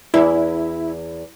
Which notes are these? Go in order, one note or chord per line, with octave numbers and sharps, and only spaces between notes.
E2 E4